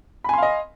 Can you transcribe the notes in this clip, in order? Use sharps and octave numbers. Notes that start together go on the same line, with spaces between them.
D#5 F5 G#5 B5 C6